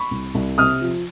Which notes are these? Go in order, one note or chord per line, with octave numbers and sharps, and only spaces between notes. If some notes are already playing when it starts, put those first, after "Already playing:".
Already playing: B5 C#6
C2
C2
C3 D#6 F6
F3